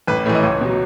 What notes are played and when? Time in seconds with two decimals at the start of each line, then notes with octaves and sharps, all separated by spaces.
0.07 A1 B4
0.26 A2 C#5
0.29 E3
0.35 D#5
0.43 C#2 C#5
0.61 B2 F#3